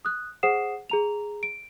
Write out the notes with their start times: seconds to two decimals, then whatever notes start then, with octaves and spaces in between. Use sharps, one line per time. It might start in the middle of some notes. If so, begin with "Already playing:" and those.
0.05 D#6 F#6
0.43 G#4 C5 F#5 D#6 C7 E7
0.90 G#4 A#5 F7
1.43 D7